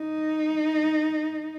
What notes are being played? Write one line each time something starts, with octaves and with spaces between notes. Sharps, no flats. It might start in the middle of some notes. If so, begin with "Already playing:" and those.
Already playing: D#4